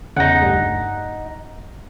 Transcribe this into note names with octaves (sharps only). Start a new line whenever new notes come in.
E2 C#3 D#4 F#5
G1 D2 G2